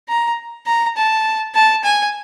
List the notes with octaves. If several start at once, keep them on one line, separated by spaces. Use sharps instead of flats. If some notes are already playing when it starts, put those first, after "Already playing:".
A#5
A#5
A5
A5
G#5